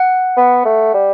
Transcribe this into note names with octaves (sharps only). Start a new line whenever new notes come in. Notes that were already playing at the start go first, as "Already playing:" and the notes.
Already playing: F#5
B3
A3
G3